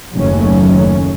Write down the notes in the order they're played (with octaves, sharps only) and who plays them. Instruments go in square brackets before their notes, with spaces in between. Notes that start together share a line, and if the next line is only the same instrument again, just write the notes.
[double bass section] F#1 D#2 D#3 F#3 A3 C#4